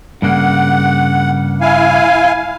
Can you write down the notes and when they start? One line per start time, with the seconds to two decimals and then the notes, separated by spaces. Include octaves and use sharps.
0.22 G2 C#3 A#3 F#5
1.61 E4 F5 G#5